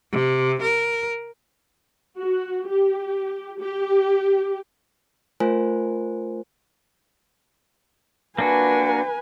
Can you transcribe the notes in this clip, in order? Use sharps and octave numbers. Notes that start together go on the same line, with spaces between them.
C3
A#4
F#4
G4
G4
A3 F4 A#4 C5 G#5
A#3 D4 F#4 B4 G#5